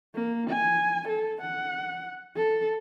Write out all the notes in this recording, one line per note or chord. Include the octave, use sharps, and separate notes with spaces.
A#3
G#5
A4
F#5
A4